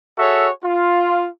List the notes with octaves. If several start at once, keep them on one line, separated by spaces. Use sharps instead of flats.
F#4 G#4 A4 C#5 E5
F4